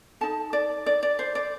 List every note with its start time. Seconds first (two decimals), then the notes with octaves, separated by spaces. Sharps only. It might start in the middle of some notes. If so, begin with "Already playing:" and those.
0.21 D#4 A4 A5
0.53 D5
0.86 D5
1.03 D5
1.19 C5
1.35 D5